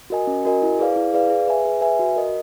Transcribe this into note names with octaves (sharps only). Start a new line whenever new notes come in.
F#4 A#4 D#5 G#5
C#4
F#4 A#4 D#5 G#5
E4
G#4 B4 D5 F5
E4
G#4 B4 D5 F5
G#4
B4 E5 G#5
G#4
B4 E5 G#5
F#4
A#4 D#5